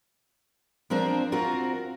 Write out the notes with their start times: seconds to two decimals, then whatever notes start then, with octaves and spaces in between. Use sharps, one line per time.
0.90 F3 C4 D4 A#4 C5
1.32 C4 F4 F#4 A#4